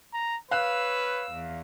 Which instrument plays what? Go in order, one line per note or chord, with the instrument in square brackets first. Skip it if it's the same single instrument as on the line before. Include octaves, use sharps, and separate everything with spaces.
[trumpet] A#5
[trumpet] B4 [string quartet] C#5 E6 [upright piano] F5 F#6
[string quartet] E2